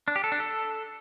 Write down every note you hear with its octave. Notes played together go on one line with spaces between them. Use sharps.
D4
G4
A4
D4
A4